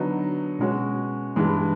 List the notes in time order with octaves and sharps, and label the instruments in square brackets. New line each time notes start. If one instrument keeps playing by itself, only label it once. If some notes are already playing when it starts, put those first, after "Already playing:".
Already playing: [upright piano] D3 F#3 B3 D#4
B2 G#3 C#4 F#4
G2 E3 G#3